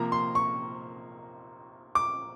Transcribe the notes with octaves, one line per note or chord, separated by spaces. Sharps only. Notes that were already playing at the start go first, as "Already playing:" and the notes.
Already playing: C3 F3 A#3 A#5
C6
C#6
D6